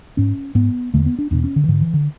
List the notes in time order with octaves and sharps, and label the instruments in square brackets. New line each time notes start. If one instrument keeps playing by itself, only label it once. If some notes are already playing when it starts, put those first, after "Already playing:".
[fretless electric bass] G#2 C#4
G#2 B3
E2 D3 A3
B3
D4
E2 B2 D4
C#4
D3
E3
G#2 D3
E3
D3